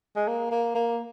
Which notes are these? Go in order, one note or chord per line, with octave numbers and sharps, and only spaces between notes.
G#3
A#3
A#3
A#3